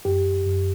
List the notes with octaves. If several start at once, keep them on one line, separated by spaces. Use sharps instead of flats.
F#2 G4
F#2